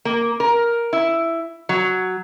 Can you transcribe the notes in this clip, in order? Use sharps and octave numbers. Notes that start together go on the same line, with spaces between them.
A#3
A#4
E4
F#3